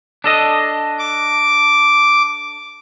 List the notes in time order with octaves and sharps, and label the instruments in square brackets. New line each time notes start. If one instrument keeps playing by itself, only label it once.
[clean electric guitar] D4 A4 D#5
[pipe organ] D6